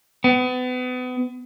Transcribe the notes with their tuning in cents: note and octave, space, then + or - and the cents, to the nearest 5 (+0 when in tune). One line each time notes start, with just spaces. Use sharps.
B3 +35